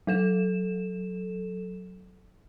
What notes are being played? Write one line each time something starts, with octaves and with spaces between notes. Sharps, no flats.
F#3 A4 E7